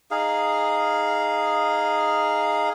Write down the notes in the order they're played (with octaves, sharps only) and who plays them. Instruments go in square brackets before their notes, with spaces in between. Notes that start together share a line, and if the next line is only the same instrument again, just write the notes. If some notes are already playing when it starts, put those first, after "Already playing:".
[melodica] D#4 G#4 F5